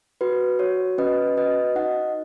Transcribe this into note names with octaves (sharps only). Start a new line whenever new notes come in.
F#4 B4
F#4 C#5
C#4 B4 D#5
F#4 B4 D#5
D#4 D#5 F#5